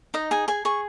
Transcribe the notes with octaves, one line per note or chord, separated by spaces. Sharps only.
D#4 D#5
G#4 G#5
G#4 G#5
G#4 C#6